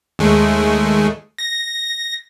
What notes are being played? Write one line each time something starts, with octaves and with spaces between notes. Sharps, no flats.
D#2 G#3 A3
A#6